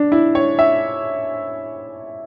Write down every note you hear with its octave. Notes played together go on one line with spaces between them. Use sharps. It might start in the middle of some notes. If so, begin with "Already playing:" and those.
Already playing: D4
E4
C#5
E5